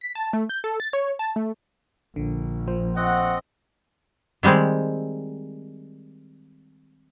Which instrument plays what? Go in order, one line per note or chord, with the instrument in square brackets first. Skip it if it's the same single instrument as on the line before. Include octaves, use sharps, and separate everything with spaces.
[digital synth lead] B6
A5
A3
G6
A4
A6
C#5
A5
A3
[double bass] A#1 [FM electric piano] D3
[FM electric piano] F3 C5
[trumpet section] A3 F#5 [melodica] C4 D#5
[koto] D#3 G3 G#3 C4 G#4